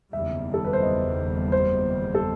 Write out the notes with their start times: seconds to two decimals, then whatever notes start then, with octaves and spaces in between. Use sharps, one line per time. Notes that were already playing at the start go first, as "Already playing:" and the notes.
0.13 F#1 E2 D#3 G3 E5
0.54 A4
0.64 B4
0.73 C5
0.83 D#5
1.52 C5
2.15 A4